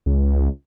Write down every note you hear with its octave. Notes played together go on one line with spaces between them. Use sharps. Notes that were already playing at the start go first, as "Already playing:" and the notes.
C#2